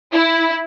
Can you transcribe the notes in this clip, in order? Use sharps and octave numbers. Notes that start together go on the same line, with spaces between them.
E4